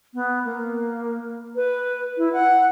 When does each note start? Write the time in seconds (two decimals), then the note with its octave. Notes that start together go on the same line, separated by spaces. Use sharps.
0.14 B3
0.45 A#3
1.56 B4
2.18 E4
2.33 F#5